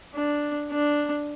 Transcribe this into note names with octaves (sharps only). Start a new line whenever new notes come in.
D4
D4